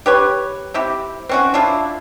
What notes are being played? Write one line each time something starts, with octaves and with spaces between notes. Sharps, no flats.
G4 B4 C#5
C4 E4 G4
C4 C#4 F#4
D4 E4 F4